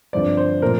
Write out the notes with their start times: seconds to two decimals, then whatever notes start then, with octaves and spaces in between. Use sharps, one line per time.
0.13 G2 D3 F3 C4 D5
0.37 C5
0.61 A#2 F3 A3 C4 A#4